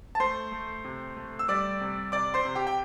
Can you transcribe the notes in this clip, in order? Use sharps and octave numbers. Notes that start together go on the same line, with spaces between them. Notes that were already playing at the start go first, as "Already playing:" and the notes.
A5
A3 C5 C6
A3
C3
A3
E6
G3 D5 D6
C3
C3 D5 D6
C5 C6
C3
G4 G5
G5